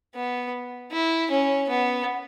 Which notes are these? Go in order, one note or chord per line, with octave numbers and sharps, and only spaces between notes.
B3
E4
C#4
B3